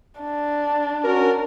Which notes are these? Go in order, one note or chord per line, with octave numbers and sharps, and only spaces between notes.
D4
C#4 F#4 A#4